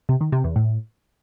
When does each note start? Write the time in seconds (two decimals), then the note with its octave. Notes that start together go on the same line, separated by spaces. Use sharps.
0.09 C3
0.21 D#3
0.32 C3
0.44 E2
0.56 A2